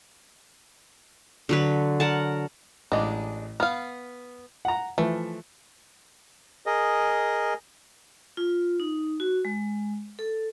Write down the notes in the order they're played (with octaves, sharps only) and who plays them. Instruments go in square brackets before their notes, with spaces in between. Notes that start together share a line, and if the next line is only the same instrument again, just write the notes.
[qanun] D3 F#3 B4
A#4 F#5 A5
[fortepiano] A1 D#5 D6 [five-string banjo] G#3 D4
[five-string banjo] B3 F5 [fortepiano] F6
[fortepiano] F#5 A#5
[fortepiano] E3 F3 [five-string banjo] A3
[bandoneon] G#4 A#4 D#5
[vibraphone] F4
D#4
F#4
G#3
A4